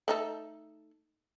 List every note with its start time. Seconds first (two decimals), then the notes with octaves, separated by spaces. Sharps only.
0.08 A3 D#4 A4